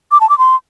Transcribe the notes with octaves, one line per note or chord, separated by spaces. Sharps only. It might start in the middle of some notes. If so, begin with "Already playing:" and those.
D6
A5
D6
C6